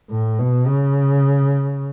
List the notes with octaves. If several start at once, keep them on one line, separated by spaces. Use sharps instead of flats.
A2
B2
C#3